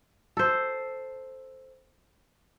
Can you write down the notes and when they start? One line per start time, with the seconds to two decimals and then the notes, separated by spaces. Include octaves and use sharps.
0.37 A4 C5